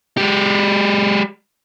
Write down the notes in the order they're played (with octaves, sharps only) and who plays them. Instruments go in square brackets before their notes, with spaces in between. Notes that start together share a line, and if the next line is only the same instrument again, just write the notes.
[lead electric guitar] G#3 G4